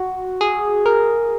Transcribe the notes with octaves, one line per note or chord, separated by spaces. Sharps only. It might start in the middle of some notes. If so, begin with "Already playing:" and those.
Already playing: F#4
G#4
A#4